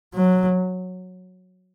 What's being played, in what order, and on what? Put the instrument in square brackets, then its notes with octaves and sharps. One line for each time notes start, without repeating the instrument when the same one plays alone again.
[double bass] F#3